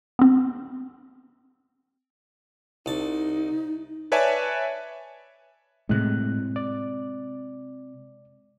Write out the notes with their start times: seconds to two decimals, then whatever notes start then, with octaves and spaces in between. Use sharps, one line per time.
0.19 B3 C4
2.86 C2 D#4 A5
4.12 B4 C#5 D5 E5 G#5 A5
5.89 A2 C3 G#3 F#6
6.56 D5